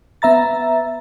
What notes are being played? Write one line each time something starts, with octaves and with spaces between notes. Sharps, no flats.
B3 E5 A#5 A6